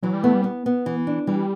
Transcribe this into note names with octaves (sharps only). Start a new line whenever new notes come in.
E3 F#3
G3
A3 B3
G3
B3
B3
E3
D4
E3 G3